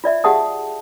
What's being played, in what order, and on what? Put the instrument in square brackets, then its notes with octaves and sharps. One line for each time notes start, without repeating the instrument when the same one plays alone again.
[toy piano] F4 D5 E5
G4 G#4 F5 F#5 A5 D#6